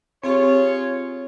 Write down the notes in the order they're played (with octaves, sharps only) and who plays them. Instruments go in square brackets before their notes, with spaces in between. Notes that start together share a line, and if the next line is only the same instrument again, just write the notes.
[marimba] C4 G4 [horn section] F4 G#4 C#5